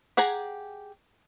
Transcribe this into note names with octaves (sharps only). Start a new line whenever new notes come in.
G4 G#4 F#5 G#5 A#5